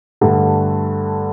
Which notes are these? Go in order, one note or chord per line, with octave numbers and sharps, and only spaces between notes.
G2 D3 A3